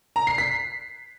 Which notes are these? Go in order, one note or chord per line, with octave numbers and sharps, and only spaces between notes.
A#5
C7
B6